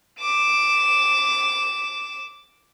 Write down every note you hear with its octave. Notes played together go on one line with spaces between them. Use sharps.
D6 E7